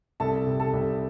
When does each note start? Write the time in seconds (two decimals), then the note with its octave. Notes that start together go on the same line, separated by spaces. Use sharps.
0.20 C2 A4 A5
0.46 C3
0.60 A4 A5
0.73 C2